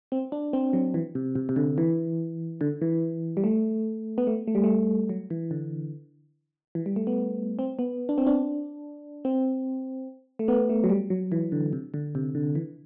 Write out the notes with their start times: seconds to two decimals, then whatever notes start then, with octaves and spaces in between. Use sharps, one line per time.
0.12 C4
0.32 D4
0.53 C4
0.73 F#3
0.94 E3
1.15 C3
1.35 C3
1.49 C3
1.56 D3
1.78 E3
2.61 D3
2.82 E3
3.37 G3
3.44 A3
4.18 B3
4.27 A3
4.47 A3
4.55 G3
4.64 A3
5.09 F#3
5.30 E3
5.51 D3
6.75 E3
6.86 G3
6.96 A3
7.07 B3
7.59 C4
7.79 B3
8.09 D4
8.18 C4
8.27 D4
9.25 C4
10.39 A3
10.48 B3
10.69 A3
10.84 F#3
10.89 G3
11.10 F#3
11.32 E3
11.52 D3
11.73 C3
11.94 D3
12.15 C3
12.35 D3
12.55 E3